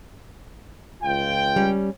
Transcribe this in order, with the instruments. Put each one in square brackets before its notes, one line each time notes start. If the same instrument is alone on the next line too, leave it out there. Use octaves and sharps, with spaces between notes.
[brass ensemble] C#2 F4 G5
[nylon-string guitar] G3 C#4